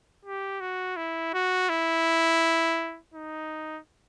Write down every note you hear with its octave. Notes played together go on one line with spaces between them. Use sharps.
G4
F#4
E4
F#4
E4
D#4